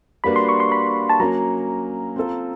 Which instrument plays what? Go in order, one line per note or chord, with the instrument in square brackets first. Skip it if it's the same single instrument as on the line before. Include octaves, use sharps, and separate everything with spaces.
[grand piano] G3 A#3 D4 F#4 B4 [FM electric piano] B5
[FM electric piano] C6
C#6
C6
B5
A5
[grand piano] F#3 A#3 C#4 [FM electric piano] A#5
[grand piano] C4 F4 A4